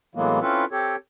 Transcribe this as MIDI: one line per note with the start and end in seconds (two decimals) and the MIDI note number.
0.15 0.40 45
0.15 0.40 52
0.15 0.40 54
0.15 0.40 56
0.15 0.40 58
0.15 0.40 59
0.41 0.65 60
0.41 0.65 61
0.41 0.65 64
0.41 0.65 65
0.41 0.65 69
0.41 0.65 71
0.72 0.96 60
0.72 0.96 67
0.72 0.96 69
0.72 0.96 73